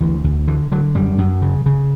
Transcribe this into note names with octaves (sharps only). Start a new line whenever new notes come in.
D2 E3
D2
D3 E3
D3 F#3
F#2 G3
F#2
C#3
C#3